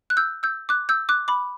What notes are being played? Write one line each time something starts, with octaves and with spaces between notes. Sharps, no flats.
F#6
E6 G6
E6 G6
D6 F#6
E6 G6
D6 F#6
B5 D6